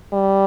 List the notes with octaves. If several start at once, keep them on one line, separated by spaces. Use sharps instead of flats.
G3